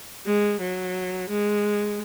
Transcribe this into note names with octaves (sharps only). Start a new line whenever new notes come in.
G#3
F#3
G#3